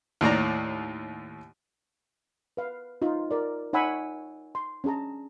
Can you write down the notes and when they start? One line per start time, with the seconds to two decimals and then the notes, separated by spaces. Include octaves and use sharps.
0.21 D#2 A2 D5 A#5
2.57 B4 F5
3.02 D#4 F4
3.31 A#4 D5
3.73 D#4 C#5 F#5 G#5 B5 E6
4.55 C6
4.84 C#4 D4 G#4 A5 A#5